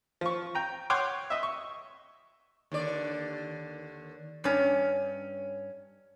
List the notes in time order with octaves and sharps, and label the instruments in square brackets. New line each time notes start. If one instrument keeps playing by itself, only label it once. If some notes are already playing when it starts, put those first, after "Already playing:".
[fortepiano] F3 C#6
G5 A#5
C#5 F#5 G5 C6 D6
D#5 E5
C#6
[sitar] D#2 D3 D5
[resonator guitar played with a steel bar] G2 C#4